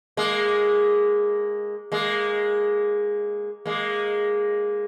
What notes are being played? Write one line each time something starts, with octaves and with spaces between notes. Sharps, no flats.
G#3 A#3
G#3 A#3
G#3 A#3